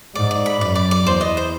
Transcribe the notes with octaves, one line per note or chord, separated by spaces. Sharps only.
G#2 D5
D5
B5
F#2 D5
D5
D5
E2 C5
D#5
C5